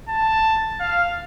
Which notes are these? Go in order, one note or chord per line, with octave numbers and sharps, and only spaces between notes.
A5
F5